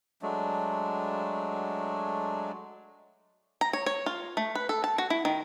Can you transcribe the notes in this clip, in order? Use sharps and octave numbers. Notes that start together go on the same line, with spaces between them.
F#3 G#3 A3 D4
A#5
C#5
C#5
F4
A3
B4
A4
A5
F#4
E4
D#3